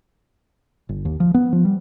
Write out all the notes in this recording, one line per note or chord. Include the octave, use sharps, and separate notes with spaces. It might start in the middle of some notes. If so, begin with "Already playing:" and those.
G1
D#2
F3
B3
F3
G3